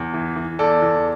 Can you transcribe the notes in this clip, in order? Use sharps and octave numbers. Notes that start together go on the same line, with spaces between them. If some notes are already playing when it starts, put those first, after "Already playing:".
Already playing: E2
E3
E3
E2 A4 D5
E2